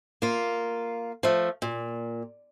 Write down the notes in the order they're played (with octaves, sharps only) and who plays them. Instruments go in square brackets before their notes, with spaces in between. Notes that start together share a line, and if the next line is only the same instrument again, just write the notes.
[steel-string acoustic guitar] A#3 F4
F3 A3
A#2